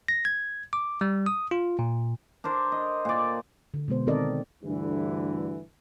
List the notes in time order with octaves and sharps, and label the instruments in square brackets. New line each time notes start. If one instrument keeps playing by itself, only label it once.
[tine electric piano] A#6
G#6
D6
G3
D#6
F4
A#2
[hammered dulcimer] D4 A#4 C5
D#5
A#2 D5
[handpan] D3
B2 G#3 B3 C5
D#3 C4 A4 A#4 D5 D#5
[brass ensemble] D2 G2 D3 E3